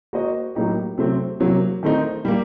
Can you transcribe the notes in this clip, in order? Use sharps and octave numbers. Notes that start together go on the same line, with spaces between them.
A#3 F#4 C5 D#5
A2 F#3 A#3 D#4 G4
C3 F#3 A3 C4
C3 F#3 A#3
D#3 A3 C4 D#4
G3 A#3